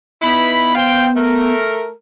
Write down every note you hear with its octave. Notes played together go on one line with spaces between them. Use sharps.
B3 D#4 E4 B5
C5 F5 G5
A3 A#4